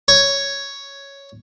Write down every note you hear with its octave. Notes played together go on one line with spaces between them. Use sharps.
C#5